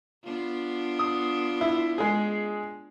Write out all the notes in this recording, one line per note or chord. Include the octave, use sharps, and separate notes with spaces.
B3 D4 F4
D#6
E4
G#3 G#4